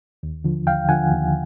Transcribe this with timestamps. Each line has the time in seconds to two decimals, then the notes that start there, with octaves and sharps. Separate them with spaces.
0.23 D#2
0.44 D3 F3
0.67 D#2 F5 G5
0.88 D3 F3 F#5 G#5
1.11 D#2